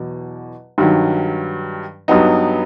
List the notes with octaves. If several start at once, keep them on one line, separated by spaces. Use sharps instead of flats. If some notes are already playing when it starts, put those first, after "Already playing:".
Already playing: E2 B2 F#3
G2 D#3 F#3
G2 F#3 B3 D#4